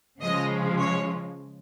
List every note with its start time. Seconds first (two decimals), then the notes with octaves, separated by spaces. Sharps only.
0.21 C#3 F3 G#3 D#5
0.79 C#5